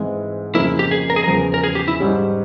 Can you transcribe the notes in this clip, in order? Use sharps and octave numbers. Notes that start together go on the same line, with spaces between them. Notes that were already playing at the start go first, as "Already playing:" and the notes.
Already playing: G#2 E3 G#3 C4
F2 C#3 F3 A#3 E4
G4
G#4
A#4
G#4
E2 C#3 F3 A#4
A#4
G#4
G4
E4
G#2 G3 C#4